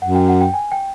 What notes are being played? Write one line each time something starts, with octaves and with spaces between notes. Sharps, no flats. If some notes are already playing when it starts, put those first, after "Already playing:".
F#2 F#5
G5
F#5
G5
G#5
G5